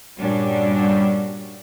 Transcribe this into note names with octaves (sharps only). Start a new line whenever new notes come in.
G2 A#2 G3 C#4 D4 F#4